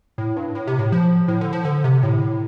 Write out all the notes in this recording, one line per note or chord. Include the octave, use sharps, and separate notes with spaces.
A2
G2
A2
C3
A2
F3
A2
D3
F3
D3
C3
A2